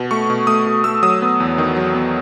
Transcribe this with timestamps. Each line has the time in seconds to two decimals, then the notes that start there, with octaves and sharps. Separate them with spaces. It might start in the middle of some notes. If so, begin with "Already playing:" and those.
Already playing: B2
0.11 A3 C#6
0.30 B2
0.47 A3 D#6
0.66 B2
0.84 A3 E6
1.03 F#3 D#6
1.22 B3
1.40 E2
1.58 D#3
1.77 F#3
1.95 B3